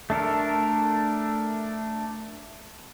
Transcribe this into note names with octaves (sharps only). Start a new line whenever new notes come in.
A3 D4 A4 A#4